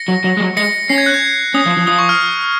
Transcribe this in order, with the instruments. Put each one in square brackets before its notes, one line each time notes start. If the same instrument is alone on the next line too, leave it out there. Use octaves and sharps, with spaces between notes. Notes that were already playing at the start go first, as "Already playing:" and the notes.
Already playing: [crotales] A#6 C#7
[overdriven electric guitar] F#3
F#3
G#3
F#3
[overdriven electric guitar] G#3 [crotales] A#6 C#7
[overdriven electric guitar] C#4 [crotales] C7
[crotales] G#6
F#6
G#6
[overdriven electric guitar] C#4 [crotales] D#6
[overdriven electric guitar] F3
F3
[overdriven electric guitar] F3 [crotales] D#6
[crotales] C#6
F6